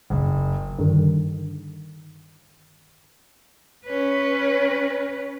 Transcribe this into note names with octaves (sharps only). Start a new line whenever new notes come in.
F#1
G2 D3 D#3
C#4 B4